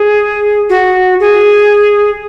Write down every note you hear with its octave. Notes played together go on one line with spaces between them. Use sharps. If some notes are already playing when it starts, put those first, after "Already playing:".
Already playing: G#4
F#4
G#4